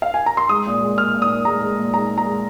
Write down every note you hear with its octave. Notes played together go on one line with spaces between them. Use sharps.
F5
G#5
A#5
C6
G#3 D#6
A#2
G#3
A#2 F6
A#2
D#6
A#2
G#3 A#5
G#3
A#2
G#3 A#5
A#2
A#5
G#3